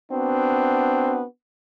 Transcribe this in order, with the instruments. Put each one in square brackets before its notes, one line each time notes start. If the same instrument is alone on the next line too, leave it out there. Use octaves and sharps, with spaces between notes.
[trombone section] B3 C4 D4 F#4